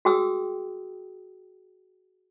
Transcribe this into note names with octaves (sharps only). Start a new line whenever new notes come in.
F#4 G#4 G5 D#6 E6